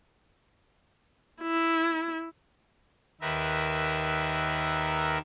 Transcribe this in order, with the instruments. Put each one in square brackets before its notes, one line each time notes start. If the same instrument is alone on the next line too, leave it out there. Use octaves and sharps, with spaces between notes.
[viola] E4
[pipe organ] D#2 D#3 A#4 B4 E5